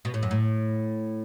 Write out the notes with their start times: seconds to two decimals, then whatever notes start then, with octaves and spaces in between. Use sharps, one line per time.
0.05 B2
0.14 A2
0.23 F#2
0.31 A2